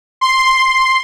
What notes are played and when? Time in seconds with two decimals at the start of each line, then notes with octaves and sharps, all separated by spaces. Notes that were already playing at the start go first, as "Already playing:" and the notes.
0.21 C6